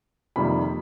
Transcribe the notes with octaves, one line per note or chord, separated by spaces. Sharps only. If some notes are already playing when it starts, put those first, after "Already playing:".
F2 C3 D#3 G3 A#3 B5